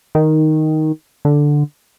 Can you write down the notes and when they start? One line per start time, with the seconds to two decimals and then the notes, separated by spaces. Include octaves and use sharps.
0.15 D#3
1.25 D3